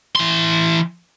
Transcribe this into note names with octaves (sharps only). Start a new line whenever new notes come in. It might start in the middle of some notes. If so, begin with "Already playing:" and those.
E3 C6